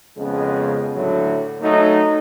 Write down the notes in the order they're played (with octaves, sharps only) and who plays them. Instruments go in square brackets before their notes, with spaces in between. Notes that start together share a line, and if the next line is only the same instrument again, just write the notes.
[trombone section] F2 C#3 G#3 B3
A2 D3 F#3 A3
F#3 A3 D#4